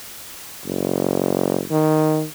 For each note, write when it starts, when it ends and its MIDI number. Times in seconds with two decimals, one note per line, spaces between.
0.66 1.63 30
1.71 2.25 51